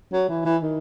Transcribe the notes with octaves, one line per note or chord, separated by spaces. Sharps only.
F#3
E3
E3
D#3